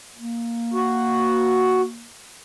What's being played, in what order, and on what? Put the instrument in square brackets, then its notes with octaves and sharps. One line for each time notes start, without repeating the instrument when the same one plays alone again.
[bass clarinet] A#3
[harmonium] F#4